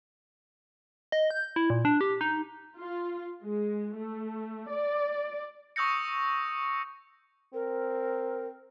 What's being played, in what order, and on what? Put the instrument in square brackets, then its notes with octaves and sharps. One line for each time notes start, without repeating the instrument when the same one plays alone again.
[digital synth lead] D#5
G6
E4
A#2
D4
G4
D#4
[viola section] F4
G#3
A3
D5
[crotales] C#6 D#6 E6 G6 A#6 C#7
[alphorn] C4 [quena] A#4